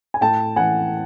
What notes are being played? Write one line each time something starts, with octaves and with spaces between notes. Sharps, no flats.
G#5
A2 G5 A5
E3 F#5 G#5